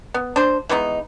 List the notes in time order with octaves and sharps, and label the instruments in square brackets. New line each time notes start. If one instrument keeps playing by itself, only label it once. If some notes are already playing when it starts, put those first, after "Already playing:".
[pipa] B3
D4 C5
E3 G#3 B3 D#4